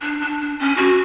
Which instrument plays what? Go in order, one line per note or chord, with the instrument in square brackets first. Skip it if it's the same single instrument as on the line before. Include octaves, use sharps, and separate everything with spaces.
[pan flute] D4
D4
D4
C#4
F#4